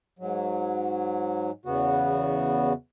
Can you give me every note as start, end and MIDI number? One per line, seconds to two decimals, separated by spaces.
0.19 1.50 44
0.19 1.50 54
1.65 2.73 40
1.65 2.73 49
1.65 2.73 59
1.65 2.73 66